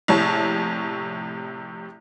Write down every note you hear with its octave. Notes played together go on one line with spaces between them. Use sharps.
A#1 A2 C3 C#5 A5